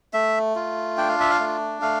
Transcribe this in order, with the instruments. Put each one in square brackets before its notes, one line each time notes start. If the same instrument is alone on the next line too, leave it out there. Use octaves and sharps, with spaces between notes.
[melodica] A3 E5
F4
D4 G5
F5
E5
F5
A3
A3 F5